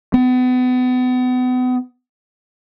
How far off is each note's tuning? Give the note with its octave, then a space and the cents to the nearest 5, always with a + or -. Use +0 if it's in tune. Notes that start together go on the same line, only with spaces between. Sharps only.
B3 +35